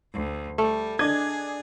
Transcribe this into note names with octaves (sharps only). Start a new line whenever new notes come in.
D2
G3 A3
D4 G#4 D#5 G#6